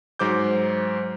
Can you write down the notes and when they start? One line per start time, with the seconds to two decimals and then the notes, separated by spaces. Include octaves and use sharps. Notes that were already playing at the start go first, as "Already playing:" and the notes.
0.19 G#2 F#3 C5 D6 G6